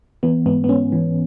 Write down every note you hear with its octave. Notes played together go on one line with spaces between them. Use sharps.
E3 B3
G#2 B3
B3
G#2 C#4
E3